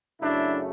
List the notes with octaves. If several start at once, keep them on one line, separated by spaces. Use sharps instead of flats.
F#2 C#3 F#3 A3 D4 E4